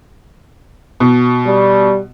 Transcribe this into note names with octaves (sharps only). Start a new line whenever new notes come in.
B2
G3